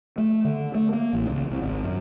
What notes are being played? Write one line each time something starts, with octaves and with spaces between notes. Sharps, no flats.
A3
D3
A3
A#3
A1
C#2
C2
G#1
F#2